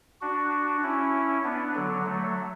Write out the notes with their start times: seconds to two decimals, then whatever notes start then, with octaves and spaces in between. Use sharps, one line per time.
0.21 D4 F#4
0.83 C#4 E4
1.44 B3 D4
1.75 D3 F#3
2.06 F#3 A3